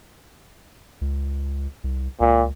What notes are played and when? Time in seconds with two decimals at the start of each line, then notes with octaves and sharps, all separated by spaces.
1.01 C#2
1.84 C2
2.20 C#2 A#2